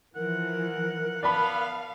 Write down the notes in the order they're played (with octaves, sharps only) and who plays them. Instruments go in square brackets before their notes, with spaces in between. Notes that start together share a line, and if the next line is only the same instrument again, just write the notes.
[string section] E3 F3 [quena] A#4 [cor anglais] F#5
[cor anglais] B3 [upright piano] D5 A5 B5 [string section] F5